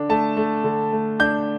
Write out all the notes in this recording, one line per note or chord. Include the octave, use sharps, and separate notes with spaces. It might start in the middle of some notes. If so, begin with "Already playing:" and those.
Already playing: D3 D4
A3 A5
A3
D3
A3
D4 G6